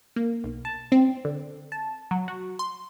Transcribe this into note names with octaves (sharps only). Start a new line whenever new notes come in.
A#3
B1
A5
C4
D3
A5
F#3
F#4
C6